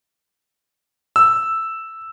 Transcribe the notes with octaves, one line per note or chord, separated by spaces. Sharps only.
E6